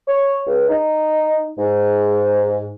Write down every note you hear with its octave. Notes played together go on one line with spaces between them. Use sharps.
C#5
C#2
D#4
G#2